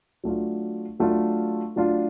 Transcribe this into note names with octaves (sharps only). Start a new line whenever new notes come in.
F#3 A3 D4 F4
F#3 A3 D4 F4
F#3 A3 D4 F4